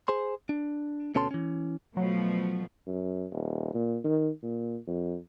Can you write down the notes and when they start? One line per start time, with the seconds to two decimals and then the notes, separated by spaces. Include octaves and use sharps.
0.08 G#4 C5 C6
0.49 D4
1.15 D2 B2 C#4 A4 A5 C6
1.31 E3 C#4
1.97 B2 F3 F#3 A3
2.87 F#2
3.32 D#1
3.74 A#2
4.04 D#3
4.43 A#2
4.87 F2